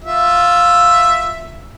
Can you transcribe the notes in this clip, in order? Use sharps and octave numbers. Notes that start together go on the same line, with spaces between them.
F4 E5